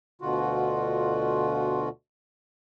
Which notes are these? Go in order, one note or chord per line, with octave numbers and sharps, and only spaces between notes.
D2 B2 D3 F4 F#4